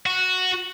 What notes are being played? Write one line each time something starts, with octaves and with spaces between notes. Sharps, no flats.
F#4